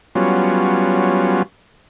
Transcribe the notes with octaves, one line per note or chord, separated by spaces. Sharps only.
F#3 G3 B3 C#4 F4